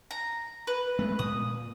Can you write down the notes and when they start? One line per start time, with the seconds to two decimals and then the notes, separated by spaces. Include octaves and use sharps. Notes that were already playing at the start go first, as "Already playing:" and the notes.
0.11 A#5
0.67 B4
0.99 G#3 A3 B3
1.19 A#2 D#6